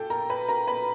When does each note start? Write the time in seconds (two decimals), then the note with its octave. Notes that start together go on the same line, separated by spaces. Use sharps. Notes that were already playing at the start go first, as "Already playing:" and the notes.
Already playing: A#2 A4 G5
0.10 A#4 A#5
0.30 B4 B5
0.48 A#4 A#5
0.67 B4 B5